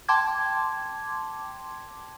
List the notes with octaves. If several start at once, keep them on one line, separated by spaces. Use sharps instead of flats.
G5 A5 C6 D6 G#6